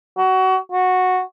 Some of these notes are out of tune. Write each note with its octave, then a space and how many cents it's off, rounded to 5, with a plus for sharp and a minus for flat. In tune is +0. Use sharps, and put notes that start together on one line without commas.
F#4 +25
F#4 -10